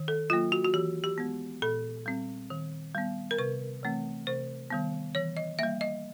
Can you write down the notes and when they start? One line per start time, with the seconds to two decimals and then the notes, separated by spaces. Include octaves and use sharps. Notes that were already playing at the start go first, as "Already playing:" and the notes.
Already playing: D#3
0.08 A4
0.30 F#3 A#3 F4
0.52 F#4
0.65 F#4
0.74 E3 G4
1.04 G4
1.18 G#3 B3
1.62 A#2 A4
2.06 G3 C4
2.50 D#3
2.95 G3 B3
3.31 A#4
3.38 C3 B4
3.83 E3 A3 C4
4.27 C3 C5
4.70 D#3 G3 B3
5.15 E3 C#5
5.37 D#5
5.59 G3 A#3 E5
5.81 D#5